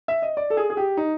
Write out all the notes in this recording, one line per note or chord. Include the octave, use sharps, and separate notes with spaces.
E5
D#5
D5
A4
G#4
G#4
G4
D#4